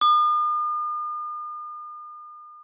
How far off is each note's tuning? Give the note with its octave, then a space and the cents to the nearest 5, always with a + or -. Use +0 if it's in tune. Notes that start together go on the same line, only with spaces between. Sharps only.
D#6 -45